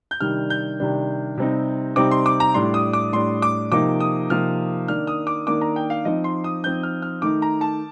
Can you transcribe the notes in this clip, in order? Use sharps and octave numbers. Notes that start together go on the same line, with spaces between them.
G6
C3 D#3 G3 D4 F6
G6
C3 D#3 G3 D4
C3 G3 C4 D#4
C3 G3 C4 D#4 D6
C6
D6
A#5
A2 G3 D4 C6
D#6
D6
A2 G3 D4 C6
D6
C3 F3 A#3 D#4 D6
D#6
C3 F3 A#3 D#4 F6
D#3 A#3 D4 F6
D#6
D6
D#3 A#3 D4 D6
A#5
G5
F5
F3 C4 D#4 D#5
C6
D#6
F3 C4 D#4 G6
F6
F6
D#3 A3 D#4 D6
A#5
A5